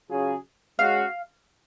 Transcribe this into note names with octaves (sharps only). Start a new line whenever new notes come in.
C#3 F#3 C#4 F4 G#4
G#3 C#4 F#4 F5